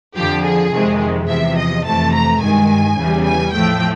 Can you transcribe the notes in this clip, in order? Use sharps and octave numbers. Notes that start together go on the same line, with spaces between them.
F2 D3 F3 G4
G#4
F2 C3 D#3 G#3
E2 C3 F3 E5
D#5
F2 C3 E3 A3 A5
A#5
G2 D#3 G#3 G#5
E2 C#3 E3 G3
G#5
A2 F3 A3 G5